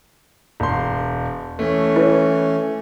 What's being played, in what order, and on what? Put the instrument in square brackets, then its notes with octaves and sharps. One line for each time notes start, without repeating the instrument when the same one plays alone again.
[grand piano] E1 C6
[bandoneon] E3 C#4 [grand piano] A3
[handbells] E4 B4 C#5